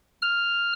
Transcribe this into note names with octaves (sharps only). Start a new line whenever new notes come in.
F6